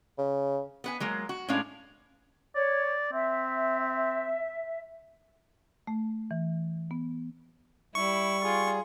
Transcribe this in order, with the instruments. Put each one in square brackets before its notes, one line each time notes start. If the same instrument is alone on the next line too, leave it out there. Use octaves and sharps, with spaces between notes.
[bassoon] C#3
[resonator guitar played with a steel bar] B3 B4 G#5
F#3 G#3 A#3
F#4
A2 G#3 C#4 D4 F5
[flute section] C#5 [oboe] D5
[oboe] C4 [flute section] E5
[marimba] A3
E3
B3
[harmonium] G3 [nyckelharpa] E4 [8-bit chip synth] C#6
[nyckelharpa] F4 [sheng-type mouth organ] G#4